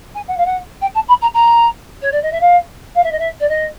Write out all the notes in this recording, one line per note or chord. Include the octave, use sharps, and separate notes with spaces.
G#5
F#5
F5
F#5
G5
A5
B5
A#5
A#5
C#5
D5
D#5
E5
F5
F5
E5
D#5
E5
D5
D#5